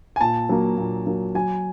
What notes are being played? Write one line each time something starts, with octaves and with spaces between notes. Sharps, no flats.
G#5
A#2 A5
F#3 A#3
A#2
F#3 A#3
F#3 G#5